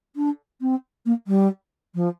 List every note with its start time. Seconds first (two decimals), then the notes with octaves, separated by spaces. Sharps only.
0.15 D4
0.61 C4
1.05 A#3
1.27 G3
1.94 F3